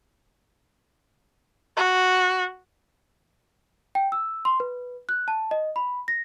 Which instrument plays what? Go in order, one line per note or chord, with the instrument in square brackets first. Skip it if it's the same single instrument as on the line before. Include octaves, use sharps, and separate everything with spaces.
[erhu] F#4
[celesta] G5
E6
C6
B4
F#6
A5
D#5
B5
A#6